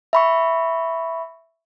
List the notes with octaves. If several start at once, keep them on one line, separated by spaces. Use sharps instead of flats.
E5 B5 C#6